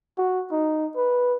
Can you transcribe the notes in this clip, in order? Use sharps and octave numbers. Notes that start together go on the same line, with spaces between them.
F#4
D#4
B4